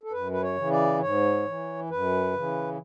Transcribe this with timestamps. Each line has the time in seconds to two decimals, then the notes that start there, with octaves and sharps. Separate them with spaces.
0.03 A4
0.12 F#2 B4
0.32 B4
0.42 C#5
0.56 C#3 E3
0.71 D5
1.00 G#2 C#5
1.45 E3
1.90 F#2 B4
2.33 C#3 E3